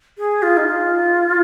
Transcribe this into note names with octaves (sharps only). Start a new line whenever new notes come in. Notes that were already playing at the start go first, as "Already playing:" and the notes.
G#4
F4
D#4
F4